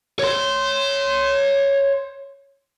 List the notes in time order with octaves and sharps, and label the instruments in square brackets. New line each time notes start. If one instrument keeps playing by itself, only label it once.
[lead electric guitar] C#5 C6